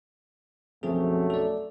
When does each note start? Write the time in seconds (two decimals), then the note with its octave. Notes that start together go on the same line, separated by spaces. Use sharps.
0.83 B1 F#2 F3 A3 C4 G#4
1.30 A4 D5